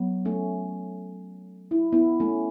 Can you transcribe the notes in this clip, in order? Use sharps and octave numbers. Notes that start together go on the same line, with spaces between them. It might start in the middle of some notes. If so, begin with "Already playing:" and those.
Already playing: F#3 B3
A3 C#4
E4
B3 E4
A3 C#4